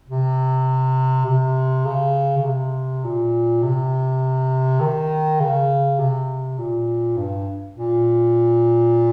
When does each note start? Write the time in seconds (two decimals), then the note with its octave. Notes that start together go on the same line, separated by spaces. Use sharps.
0.08 C3
1.26 C3
1.85 C#3
2.38 C#3
2.44 C3
3.04 A#2
3.63 C3
4.81 D#3
5.40 C#3
5.99 C3
6.58 A#2
7.17 G2
7.77 A#2